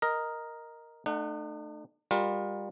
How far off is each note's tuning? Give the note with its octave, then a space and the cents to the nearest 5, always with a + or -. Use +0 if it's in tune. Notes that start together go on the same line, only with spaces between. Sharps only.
A#4 +0 D#5 +0
A3 +0 D#4 -45 F#5 +0
G3 +30 F4 +30 A#4 +25